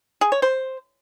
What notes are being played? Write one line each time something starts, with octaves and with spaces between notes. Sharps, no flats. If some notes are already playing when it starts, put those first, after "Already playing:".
G#4
C#5
C5